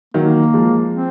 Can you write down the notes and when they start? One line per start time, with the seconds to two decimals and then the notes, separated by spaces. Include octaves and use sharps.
0.14 D#3 F#3 A#3
0.54 F3 G#3
0.93 C4